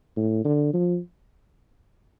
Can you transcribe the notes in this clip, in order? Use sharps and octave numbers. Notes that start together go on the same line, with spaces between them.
A2
D3
F3